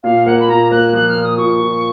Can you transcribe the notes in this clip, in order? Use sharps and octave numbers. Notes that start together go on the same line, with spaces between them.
A#2 F5
A#3 F#5
B5
A#2 A#5
A#3 F#6
F3 F#6
F6
A#2
D#6
A#2 C#6
A#2